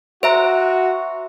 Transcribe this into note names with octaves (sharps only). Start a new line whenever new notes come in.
F#4 C5 E5 A#5